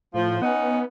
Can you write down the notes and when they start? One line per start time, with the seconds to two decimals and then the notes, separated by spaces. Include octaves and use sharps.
0.14 A2 F3
0.42 B3 C#4 D#4 F#5